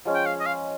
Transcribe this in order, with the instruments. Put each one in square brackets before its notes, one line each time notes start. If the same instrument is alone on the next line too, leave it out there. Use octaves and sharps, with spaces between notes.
[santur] F3 G#3 C#4
[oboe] G5
F5
D#5
F5